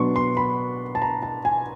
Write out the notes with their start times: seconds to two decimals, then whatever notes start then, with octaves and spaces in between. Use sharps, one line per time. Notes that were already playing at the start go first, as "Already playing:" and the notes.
Already playing: B2 F#3 B3 D4 C6 C#6
0.16 C6
0.37 B5
0.95 A5
1.02 A#5
1.23 A5
1.45 G#5